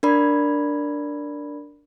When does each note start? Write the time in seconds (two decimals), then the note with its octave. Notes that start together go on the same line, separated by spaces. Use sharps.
0.03 D4 A#4 D5 B5 G#6